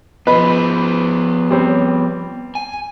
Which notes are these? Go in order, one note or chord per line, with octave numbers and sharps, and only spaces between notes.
F3 B3 B4 D#5 B5
G3 C4 C#5
G#5